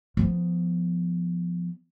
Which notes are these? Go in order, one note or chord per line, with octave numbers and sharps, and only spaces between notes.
F3 B3